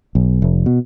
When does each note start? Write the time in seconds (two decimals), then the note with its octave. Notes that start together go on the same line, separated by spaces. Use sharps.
0.15 B1
0.42 F1
0.66 B2